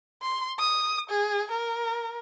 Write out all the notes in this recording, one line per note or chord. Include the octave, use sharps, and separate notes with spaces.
C6
D#6
G#4
A#4